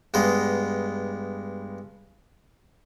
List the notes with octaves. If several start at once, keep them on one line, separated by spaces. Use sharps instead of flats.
G2 G#3 B3 D#5